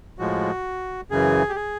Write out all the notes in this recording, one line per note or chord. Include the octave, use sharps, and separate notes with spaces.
A2 F3 G#3 F#4
F#2 C#3 E3 G#4
G4
G#4